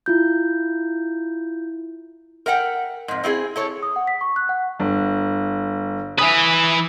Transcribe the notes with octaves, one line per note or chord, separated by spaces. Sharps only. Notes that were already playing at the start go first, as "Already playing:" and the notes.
E4 F4 G6
A#4 E5 F#5 G5
F2 G#2
C4 E4 F4 G#4
E4 A4 C#5
D#6
F#5
B6
C#6
F#6
F#5
G1
E3 B4 G#5 D#6